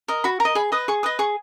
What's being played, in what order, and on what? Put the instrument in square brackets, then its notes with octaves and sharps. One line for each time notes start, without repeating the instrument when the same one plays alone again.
[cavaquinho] A#4 D#5
F#4 B5
A#4 A#5
D#5
G#4 B5
B4 D#5 D#6
G#4 C#6
B4 D#5 D#6
G#4 C#6